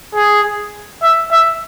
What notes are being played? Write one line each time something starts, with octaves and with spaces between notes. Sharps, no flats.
G#4
E5
E5